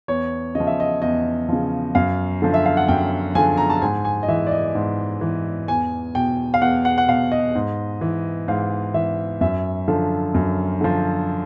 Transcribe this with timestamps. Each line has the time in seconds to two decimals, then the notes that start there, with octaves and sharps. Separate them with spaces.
0.08 E2 C#5
0.55 C#3 F3 D#5
0.67 E5
0.80 D#5
1.02 E2 D#5
1.49 C#3 F3
1.95 F#2 F5
2.42 D3 F3
2.54 E5
2.66 F5
2.77 F#5
2.88 F#2 G5
3.35 D3 F3 G#5
3.57 A#5
3.70 A5
3.82 G#2 G#5
4.05 G#5
4.23 D#5
4.28 E3 E5
4.47 D5
4.51 D#5
4.75 G#2
5.21 E3
5.68 E2 G#5
6.15 B2 G5
6.54 F5
6.61 E2 F#5
6.85 F#5
6.98 F#5
7.08 B2 F5
7.32 D#5
7.55 G#2
8.01 E3
8.48 G#2 F5
8.94 E3 E5
9.41 F#2 E5
9.88 D3 F3
10.34 F#2
10.81 D3 F3